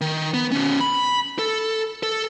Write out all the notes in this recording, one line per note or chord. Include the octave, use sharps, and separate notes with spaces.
D#3
B3
B2 C#4
B5
A4
A4